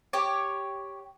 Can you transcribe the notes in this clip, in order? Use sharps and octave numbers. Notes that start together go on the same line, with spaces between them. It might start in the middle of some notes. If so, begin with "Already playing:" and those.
G4 C#5